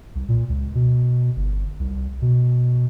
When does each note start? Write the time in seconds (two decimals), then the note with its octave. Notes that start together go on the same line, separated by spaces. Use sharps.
0.15 C2
0.28 A#2
0.49 C#2
0.75 B2
1.36 G1
1.79 C2
2.22 B2